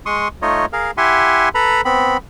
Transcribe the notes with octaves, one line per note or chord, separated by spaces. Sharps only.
G#3 C6 C#6 D#6
A3 D#4 F4 C#5 D#5
G#4 A#4 F5
E4 G4 E5 F#5 G#5 C6
A4 B4 A#5 B5
B3 C4 B5